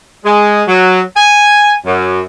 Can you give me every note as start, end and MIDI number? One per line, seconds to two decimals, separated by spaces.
0.25 0.62 56
0.68 0.99 54
1.16 1.74 80
1.86 2.21 42